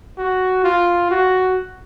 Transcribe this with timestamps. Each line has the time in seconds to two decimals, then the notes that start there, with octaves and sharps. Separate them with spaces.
0.18 F#4
0.64 F4
1.11 F#4